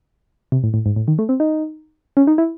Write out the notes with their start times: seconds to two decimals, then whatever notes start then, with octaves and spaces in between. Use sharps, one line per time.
0.52 C3
0.63 A2
0.74 A2
0.86 G#2
0.96 A2
1.08 D#3
1.19 A3
1.29 C4
1.40 D#4
2.17 C#4
2.27 D#4
2.38 E4